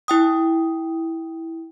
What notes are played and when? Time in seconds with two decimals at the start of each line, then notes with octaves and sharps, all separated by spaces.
0.08 E4 G5 D#6